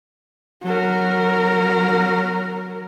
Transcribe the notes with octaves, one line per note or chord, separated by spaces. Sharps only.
F#3 A#4